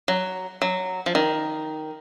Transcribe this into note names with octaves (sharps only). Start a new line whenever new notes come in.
F#3
F#3
F3
D#3